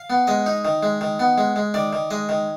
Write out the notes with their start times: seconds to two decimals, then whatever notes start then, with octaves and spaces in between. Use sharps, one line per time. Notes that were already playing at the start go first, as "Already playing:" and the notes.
Already playing: F5
0.10 B3
0.27 G#3 D#5
0.46 D#4
0.65 D#3
0.83 G#3
1.01 D#3
1.19 B3
1.38 G#3
1.56 G#3
1.74 D#3 D5
1.93 D#3
2.10 G#3 D#5
2.29 D#3